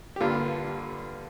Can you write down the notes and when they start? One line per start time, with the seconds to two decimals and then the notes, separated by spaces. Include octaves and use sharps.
0.16 G4
0.20 G2 D3 G3 A#3 F4